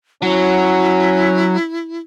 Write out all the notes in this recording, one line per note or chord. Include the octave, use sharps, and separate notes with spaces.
F#3 C#4 E4